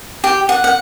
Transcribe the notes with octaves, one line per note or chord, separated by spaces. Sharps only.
G4
F#5
F#5